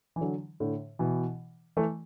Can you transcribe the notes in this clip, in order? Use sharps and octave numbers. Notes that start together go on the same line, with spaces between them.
E3
D3 F#3
A2 D3
B2 E3
E3 A3